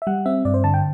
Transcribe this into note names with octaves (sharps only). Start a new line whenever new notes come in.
E5
G3 F#5
C4 E5
G2 D5
C5
D3 A5
G5